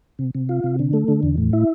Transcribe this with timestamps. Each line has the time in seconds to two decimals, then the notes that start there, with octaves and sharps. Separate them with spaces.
0.19 C3
0.35 C3
0.49 F4
0.64 C3
0.79 D3
0.93 A3
1.08 D3
1.23 E2
1.38 A2
1.53 E4